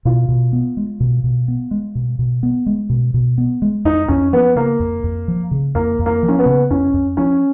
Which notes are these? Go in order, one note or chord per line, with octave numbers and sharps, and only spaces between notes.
B2 F4
B2
B3
G#3
B2
B2
B3
G#3
B2
B2
B3
G#3
B2
B2
B3
G#3
F2 D#4
F2 C#4
F3 B3
C#3 A#3
F2
F2
F3
C#3
F2 A#3
F2
A#3
F3
C#4
B3
C#3
F2 C#4
F2
F3 C#4